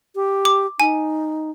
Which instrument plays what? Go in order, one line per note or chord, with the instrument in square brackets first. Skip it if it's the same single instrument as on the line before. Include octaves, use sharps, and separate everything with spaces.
[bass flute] G4
[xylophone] D6
[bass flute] D#4 [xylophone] G#5